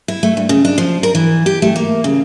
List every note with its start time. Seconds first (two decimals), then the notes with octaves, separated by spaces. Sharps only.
0.08 E4
0.23 A3
0.37 G2
0.49 C#3
0.65 D4
0.78 F3
1.03 A#4
1.15 E3
1.46 G4
1.62 A3
1.76 A#3
2.04 C#3